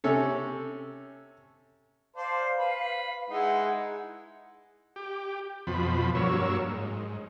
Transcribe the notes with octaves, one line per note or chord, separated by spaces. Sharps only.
C3 C#4 A4
C5 D5 F5 A5
B4 B5
G#3 D#4 E4 F#5
G4
F2 B2 F3 B5
G2 F#3 A#3 C#5 E6
G#2